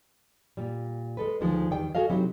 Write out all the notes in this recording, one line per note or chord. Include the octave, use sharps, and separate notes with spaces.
A#2 G3
G#3 A4 B4
D2 D#3 F3 G#3
E2 D#3 G3 D5 G5
F#4 G#4 A4 D#5 F5
C3 F#3 C4 D#4 E4 G4